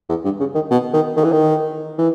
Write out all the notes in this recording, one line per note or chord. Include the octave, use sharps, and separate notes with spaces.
E2
G2
C#3
D#3
B2
D#3
D#3
E3
D#3
E3